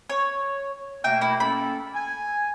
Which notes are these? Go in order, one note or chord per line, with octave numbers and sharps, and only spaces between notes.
C#5
B2 A3 A#3 E5 G5
E4
A#3 C#4 A4 B5
G#5